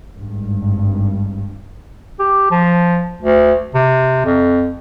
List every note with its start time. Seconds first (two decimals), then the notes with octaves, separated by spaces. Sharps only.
0.16 G#1 G2
2.19 G4
2.51 F3
3.21 D2
3.74 C3
4.25 F2